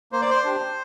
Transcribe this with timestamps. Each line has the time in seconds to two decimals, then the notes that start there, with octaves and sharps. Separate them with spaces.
0.12 A#3 C5
0.21 D5
0.30 C5
0.45 D4 G4